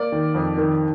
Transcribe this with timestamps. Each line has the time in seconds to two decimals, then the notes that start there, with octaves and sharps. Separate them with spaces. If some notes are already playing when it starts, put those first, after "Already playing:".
Already playing: A#3 D5
0.12 D#3
0.34 F2
0.58 D#3